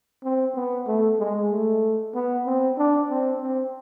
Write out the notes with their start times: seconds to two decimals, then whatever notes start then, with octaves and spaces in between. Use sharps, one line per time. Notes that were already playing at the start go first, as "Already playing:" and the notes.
0.24 C4
0.55 B3
0.87 A3
1.19 G#3
1.51 A3
2.14 B3
2.46 C4
2.78 D4
3.10 C4
3.42 C4